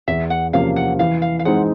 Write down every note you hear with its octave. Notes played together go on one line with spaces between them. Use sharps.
E2 E5
F#5
C3 F3 A#3 C#4 F5
F#5
E3 F5
F5
F5
G#3 C4 D#4 F#5